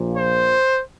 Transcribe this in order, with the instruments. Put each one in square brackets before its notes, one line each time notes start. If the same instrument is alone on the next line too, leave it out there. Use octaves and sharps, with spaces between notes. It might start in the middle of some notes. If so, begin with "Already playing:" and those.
Already playing: [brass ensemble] A#1 A#2 F3
C5